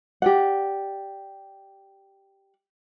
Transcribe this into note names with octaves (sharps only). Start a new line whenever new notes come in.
G4 D5 F#5